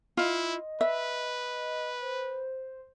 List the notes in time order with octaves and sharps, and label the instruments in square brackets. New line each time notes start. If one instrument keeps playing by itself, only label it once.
[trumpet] E4 [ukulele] F4 [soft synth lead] D#5
[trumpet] B4 [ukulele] E5
[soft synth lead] C5